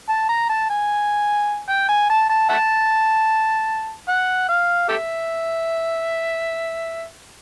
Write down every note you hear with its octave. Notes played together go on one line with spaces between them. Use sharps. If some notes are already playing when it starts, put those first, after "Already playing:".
A5
A#5
A5
G#5
G5
G#5
A5
A5
E5 F#5 A5
F#5
F5
G4 A4 E5